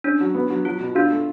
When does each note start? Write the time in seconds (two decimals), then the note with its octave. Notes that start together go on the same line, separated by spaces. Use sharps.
0.04 C#4 D4
0.21 F#3
0.35 B3
0.50 F#3
0.65 F#3 F4
0.80 B2
0.95 D4 F4
1.11 A3